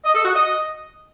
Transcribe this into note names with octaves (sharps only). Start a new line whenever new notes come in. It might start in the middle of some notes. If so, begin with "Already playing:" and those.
D#5
A4
F#4
D#5